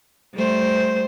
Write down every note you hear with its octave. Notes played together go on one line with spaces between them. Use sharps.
G3 A3 C5